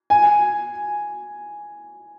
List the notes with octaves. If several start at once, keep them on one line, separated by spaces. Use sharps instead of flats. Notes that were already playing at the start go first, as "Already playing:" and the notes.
G#5